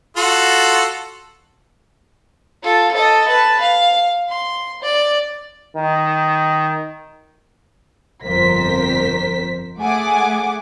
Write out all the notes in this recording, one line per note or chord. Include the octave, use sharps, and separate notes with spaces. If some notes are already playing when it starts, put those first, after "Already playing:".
F4 F#4 A4
F4 A4
A4 D#5
B4 A5
F5
C6
D5
D#3
G1 F2 A#4 C5 B6
A3 G#4 F#5 G#5 D6